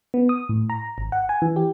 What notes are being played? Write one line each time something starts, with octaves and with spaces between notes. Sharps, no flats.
B3
D#6
A2
A#5
G#1
F#5
G#5
E3
G4